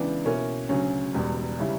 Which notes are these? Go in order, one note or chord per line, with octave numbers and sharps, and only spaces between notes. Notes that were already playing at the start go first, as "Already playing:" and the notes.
Already playing: C#2 C#3 E3 B3 D4
B2 A#3 C#4 E4 A#4
D2 C#3 F#3 C#4
E1 E2 B2 G3
C#3 G3 C#4 E4